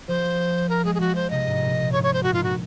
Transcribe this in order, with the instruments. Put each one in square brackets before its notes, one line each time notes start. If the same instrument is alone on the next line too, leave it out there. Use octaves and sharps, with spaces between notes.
[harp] F3 [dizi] C5
[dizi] A#4
[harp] G#3 [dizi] G#4
[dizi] G#4
[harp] F3 [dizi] F#4
[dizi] C5
[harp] C3 [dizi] D#5
[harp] G#2
A#2
A#2
[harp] G#2 [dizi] C#5
[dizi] C#5
C5
[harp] A#2 [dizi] F#4
[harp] G#2 [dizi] F4
[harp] A#2 [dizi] F#4